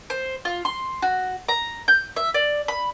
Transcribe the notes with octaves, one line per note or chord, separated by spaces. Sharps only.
C5
F4
C6
F#4
A#5
G6
E5
D5
B5